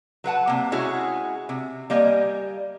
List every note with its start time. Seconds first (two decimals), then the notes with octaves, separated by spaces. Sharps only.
0.24 F#3 B4 F#5 A5
0.47 C3 A#3
0.72 G#3 C#4 E4 F#4 G#4
1.49 C3
1.90 G3 A#3 D#5 G#5